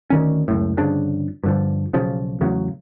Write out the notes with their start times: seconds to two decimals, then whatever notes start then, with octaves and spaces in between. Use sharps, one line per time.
0.10 D2 D#3 C#4
0.48 C#2 F#2 A2
0.77 G1 C#3 F3 D4
1.43 G2 D3 F3
1.93 B1 C#3 F3
2.41 E2 A2 C#3 F#3